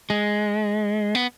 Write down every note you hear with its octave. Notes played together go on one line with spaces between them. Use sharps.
G#3
B3